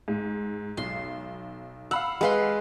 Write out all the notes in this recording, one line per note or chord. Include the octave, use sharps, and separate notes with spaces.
G#2
B1 C6
F5 F#5 B5 E6
G#3 B4 F5 F#5 C6